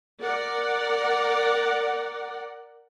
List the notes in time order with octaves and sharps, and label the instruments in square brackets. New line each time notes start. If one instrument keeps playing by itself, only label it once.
[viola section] A#4 D5 F#5